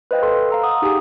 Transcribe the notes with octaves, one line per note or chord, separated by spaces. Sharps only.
B4 C5 D#5 F5 G5
A4 C6
F5 A#5 E6
F5 F#5 D#6
D#4 G4 G#4 G#5